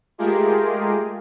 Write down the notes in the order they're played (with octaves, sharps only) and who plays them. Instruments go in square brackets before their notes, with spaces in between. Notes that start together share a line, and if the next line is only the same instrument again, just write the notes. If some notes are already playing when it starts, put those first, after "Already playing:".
[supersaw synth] G#3 A3 F4 G4 G#4 A#4